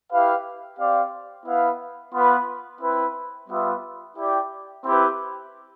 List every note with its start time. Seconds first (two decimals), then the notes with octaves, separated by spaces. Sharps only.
0.11 E4 G4 B4 F5
0.79 C4 G4 D5 F5
1.46 B3 E4 B4 F5
2.13 B3 F4 B4
2.81 C4 E4 B4
3.49 G3 B3 F4 B4 E5
4.17 E4 G4 D5 G5
4.84 C4 E4 G4 B4